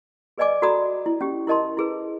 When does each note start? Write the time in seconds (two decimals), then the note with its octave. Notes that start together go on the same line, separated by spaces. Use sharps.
0.38 G#4 B4 D5 D#5 G#5 D6
0.62 F#4 A4 D5 A#5 B5 D#6
1.06 E4
1.21 C#4 G4
1.47 E4 A#4 D#5 A5 C6
1.77 E4 G#4 B4